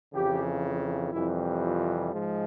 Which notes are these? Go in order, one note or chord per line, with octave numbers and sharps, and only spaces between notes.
F2 C#3 E3 G4
F2 C3 E3 G3 E4
F4
G#2 F3 G#3